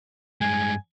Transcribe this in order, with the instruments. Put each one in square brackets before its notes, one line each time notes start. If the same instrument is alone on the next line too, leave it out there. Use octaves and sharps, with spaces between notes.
[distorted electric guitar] G2 G#3 [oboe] G#5